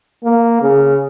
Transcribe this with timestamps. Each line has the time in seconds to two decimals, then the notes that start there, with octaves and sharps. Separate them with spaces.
0.24 A#3
0.62 C#3